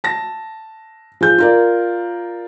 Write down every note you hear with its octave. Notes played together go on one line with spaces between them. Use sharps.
A5 A#6
F3 G#4 G6
F4 A#4 D5